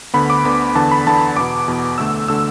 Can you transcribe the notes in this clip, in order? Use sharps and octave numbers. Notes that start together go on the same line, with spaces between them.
D2 D3 B3 B5
D6
D2 D3 B3 B5
E2 D3 B3 A5
B5
E2 D3 B3 A5
B5
E2 B2 B3 D6
E2 B2 B3
D2 D3 A3 E6
D3 A3 E6